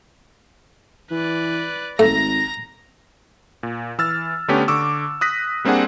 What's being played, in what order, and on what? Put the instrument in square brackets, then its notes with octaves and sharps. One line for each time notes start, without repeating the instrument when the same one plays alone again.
[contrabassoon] E3 [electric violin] B4 D5
[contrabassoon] G#1 [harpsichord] A3 [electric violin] A#5 A#6
[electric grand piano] A#2
E3 E6 F6 A6
D3 A3 B3 C#4 G4
D3 C#6 D6 E6
D#6 F#6 A#6 B6
G3 A#3 C4 D4 G#4 F#5